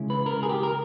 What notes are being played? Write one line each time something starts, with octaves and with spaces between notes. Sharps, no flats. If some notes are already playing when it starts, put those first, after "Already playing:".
Already playing: C#3 G#3 C#4 E4
B4
A#4
G#4
G4
A#4